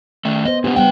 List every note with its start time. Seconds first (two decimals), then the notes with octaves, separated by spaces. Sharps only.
0.25 D#3 A3
0.45 B3 C5 D#5
0.64 A#2 C#3 B3 D4 G4 B4
0.76 C#3 G3 A#3 B3 F#5 G5